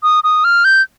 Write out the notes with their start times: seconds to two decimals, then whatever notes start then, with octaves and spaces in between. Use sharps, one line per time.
0.03 D#6
0.24 D#6
0.44 F6
0.65 G6